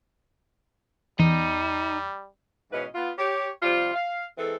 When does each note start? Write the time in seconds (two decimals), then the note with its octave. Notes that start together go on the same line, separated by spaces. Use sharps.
1.20 E2 G3 D#4
2.71 G#2 B2 E3 C#4 B4 D#5
2.94 B3 F4
3.18 G4 C#5
3.62 C3 F3 G3 F4
3.93 F5
4.38 E3 G#3 C4 A4